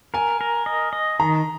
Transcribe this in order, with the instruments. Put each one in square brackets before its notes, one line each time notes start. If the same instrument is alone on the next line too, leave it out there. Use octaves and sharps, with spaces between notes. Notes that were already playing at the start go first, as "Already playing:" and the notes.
[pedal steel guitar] A#4 [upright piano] G#5
[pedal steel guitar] A#4
D#5
D#5
[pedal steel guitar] D#3 [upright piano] A#5